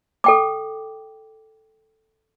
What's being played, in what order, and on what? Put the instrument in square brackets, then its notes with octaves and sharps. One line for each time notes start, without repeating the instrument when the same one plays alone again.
[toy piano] A4 G5 D6